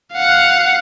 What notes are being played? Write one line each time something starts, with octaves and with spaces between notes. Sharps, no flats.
F5 F#5